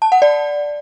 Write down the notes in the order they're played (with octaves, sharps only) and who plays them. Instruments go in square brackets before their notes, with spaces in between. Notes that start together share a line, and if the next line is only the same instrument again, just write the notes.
[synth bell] A5
F#5
D5